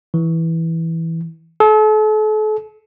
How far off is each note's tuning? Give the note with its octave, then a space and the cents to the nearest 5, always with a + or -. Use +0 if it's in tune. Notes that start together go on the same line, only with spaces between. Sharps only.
E3 -10
A4 -40